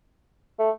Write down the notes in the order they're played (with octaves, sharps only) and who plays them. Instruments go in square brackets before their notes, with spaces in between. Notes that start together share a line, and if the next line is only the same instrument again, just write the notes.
[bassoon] A3